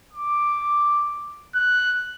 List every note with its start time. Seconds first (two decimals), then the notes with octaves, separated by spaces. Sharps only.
0.13 D6
1.56 F#6